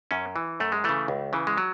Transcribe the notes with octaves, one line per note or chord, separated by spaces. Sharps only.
F#2 C#4
E3
F#2 A3
G#3
C#3 E3 A3
C#2
C#3 E3
G#3
F#3